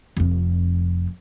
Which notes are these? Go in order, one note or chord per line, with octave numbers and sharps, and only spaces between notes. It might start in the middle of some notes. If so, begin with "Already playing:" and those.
F1 F2